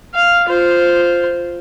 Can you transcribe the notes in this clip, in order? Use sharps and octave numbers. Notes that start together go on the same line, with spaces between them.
F5
F4 C5